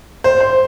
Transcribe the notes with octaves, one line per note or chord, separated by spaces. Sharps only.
C5
C5